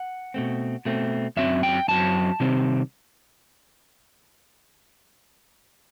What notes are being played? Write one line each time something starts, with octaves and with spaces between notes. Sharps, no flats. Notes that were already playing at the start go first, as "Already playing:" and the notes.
Already playing: F#5
B2 A3 C4
B2 A3 C4
F#2 F#3 C4 E5
G5
F#2 F#3 C4 A5
C3 D#3 G3 C4